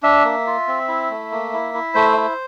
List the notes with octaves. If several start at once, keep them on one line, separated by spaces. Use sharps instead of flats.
D4 E5
A#3
F4
C4
E4
A3
A#3
E4
E4
A3 C5
E4